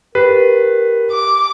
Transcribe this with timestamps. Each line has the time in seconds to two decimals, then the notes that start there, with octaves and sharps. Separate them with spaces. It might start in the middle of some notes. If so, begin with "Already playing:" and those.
0.15 G4 A#4 B4
1.11 D6